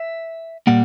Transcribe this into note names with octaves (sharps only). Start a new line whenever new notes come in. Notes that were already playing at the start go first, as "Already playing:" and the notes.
Already playing: E5
A#2 G3 A#3 F#5